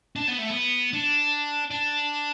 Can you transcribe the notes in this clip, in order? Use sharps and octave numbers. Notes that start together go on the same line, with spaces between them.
D4
B3
A3
B3
D4
D4